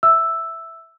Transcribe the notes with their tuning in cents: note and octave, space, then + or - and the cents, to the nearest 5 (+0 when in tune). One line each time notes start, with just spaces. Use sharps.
E5 +0 E6 +0